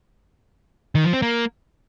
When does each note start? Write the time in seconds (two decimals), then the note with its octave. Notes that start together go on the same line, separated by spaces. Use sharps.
0.95 D#3
1.04 F3
1.13 C4
1.22 A#3